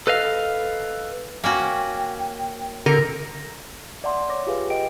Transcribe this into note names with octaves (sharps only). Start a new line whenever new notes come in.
A4 B4 D#5 F5
A#3 C#4 F#4 G5
D3 A#4
D5 E5 F#5 A5 C6
C#5 D6 A#6
F4 G4 G#4 B4 F5
D#5 G5 D7